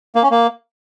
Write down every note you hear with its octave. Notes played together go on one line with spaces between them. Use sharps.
A#3
C#4
A#3